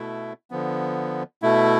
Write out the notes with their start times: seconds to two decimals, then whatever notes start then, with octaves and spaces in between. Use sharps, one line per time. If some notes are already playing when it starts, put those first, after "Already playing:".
Already playing: B2 A3 E4
0.51 D3 F3 B3
1.42 B2 A3 E4